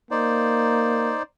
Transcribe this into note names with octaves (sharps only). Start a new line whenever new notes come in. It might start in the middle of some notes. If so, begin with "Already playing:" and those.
A#3 D#4 C5 D5